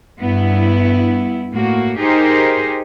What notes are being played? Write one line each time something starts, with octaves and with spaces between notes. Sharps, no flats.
G2 B3 E4
A2 A#3 F#4
D#4 G4 G#4 A#4 C5